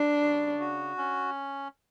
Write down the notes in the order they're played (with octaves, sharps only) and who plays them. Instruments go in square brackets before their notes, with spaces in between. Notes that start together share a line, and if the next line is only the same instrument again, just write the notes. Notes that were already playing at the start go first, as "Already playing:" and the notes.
Already playing: [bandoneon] G3 [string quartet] D4
[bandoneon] C#3
F#4
C#4